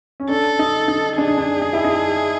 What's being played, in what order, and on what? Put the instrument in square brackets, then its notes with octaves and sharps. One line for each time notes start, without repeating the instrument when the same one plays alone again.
[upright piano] C#4
[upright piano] D4 [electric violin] A4
[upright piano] D#4
D#4
[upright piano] D4 [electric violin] G#4
[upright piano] D#4
D4
D#4
E4
D#4